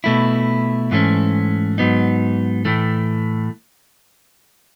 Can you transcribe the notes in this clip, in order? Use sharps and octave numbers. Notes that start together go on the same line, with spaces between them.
B2 A3 E4
G#2 E3 A3 C#4
G#2 F#3 B3 D#4
A2 E3 A3